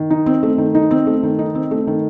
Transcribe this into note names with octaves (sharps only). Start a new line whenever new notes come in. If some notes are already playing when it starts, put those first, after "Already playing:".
Already playing: D#3
D#4
C4
A3
D#3
D#4
C4
A3
D#3
D#4
C4
A3
D#3